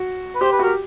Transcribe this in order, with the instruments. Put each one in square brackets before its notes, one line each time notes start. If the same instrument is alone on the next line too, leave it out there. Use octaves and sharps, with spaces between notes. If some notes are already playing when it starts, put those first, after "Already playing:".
Already playing: [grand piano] F#4
[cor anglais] B4
[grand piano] G4 [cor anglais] C5
[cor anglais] B4
[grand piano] F#4
[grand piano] G4 [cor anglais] A#4